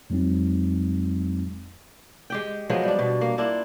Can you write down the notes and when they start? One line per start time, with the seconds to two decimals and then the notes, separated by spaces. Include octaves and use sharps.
0.10 F2 F#3 G#3 C4 D#4
2.30 G#3 G4 G5
2.70 F3 F#3 G#3 B3
2.83 G3 D4
2.99 B2
3.21 A#3
3.38 A#3 D4 E4 F4